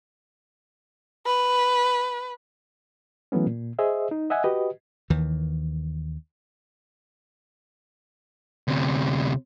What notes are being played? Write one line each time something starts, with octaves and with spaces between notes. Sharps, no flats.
B4
E3 F#3 A3 B3 C#4
A#2
G#4 C5 D#5 E5
D#4
D#5 E5 F#5 G#5
F#4 G4 B4 D#5
D#2 D#3 E3
D2 C3